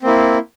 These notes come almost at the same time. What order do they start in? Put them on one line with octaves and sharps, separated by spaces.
C4 A#3 E4